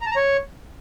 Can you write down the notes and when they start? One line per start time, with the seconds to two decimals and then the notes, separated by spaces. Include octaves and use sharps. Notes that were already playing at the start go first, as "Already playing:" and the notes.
0.01 A#5
0.06 A5
0.11 A#5
0.16 C#5